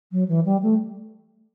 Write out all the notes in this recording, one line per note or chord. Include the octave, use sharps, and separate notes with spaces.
F#3
E3
G3
A3